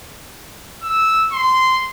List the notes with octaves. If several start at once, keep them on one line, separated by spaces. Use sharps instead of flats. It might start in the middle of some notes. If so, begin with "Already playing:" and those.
E6
C6